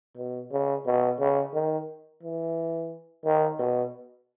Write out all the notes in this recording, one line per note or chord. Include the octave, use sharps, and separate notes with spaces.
B2
C#3
B2
C#3
D#3
E3
D#3
B2